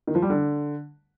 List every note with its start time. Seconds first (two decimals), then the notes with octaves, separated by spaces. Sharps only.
0.07 D#3
0.15 F3
0.22 G3
0.30 D3